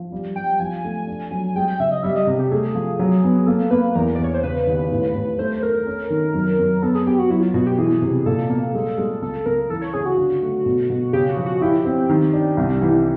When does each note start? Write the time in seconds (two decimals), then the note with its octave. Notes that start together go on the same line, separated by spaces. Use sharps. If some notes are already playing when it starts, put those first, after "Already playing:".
Already playing: F3
0.12 G3
0.36 G3 G5
0.60 F3 G#5
0.84 A3
1.07 D4
1.31 F#3
1.56 G#3 G5
1.67 G5
1.80 C#3 E5
1.91 D#5
2.03 G3 E5
2.15 D#5
2.27 C3
2.39 G4
2.51 A3 G#4
2.75 F3
2.99 F#3
3.24 B3
3.47 A#3 A4
3.71 A#3 B4
3.95 E2 A#4
4.15 E2 D5
4.24 C#5
4.34 C5
4.43 C#3 B4
4.67 D#2
4.91 A2
5.15 A2
5.38 A3 C5
5.62 A3 A#4
5.87 C#4
6.10 D#3
6.34 F#2
6.59 F#2
6.82 B3 A4
6.95 G#4
7.07 B3 G4
7.19 F#4
7.30 F#3 E4
7.43 F4
7.54 B2 F#4
7.67 G4
7.78 E3 G#4
8.02 C3
8.26 A#2 A4
8.50 A#3
8.74 G#3
8.98 G#3
9.21 C#2 A4
9.46 C#2 A#4
9.70 E3 A4
9.82 C#5
9.93 C#3 G#4
10.06 F#4
10.18 D3
10.42 A3
10.66 B2
10.89 B2
11.13 C#3 G4
11.29 F#4
11.37 F3
11.46 F#4
11.62 E4 G4
11.85 C4
12.09 D#3
12.33 D4
12.57 C2
12.81 E3